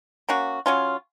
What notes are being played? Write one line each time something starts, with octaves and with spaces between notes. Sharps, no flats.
A#3 C#4 F#4
F#3 C#4 F4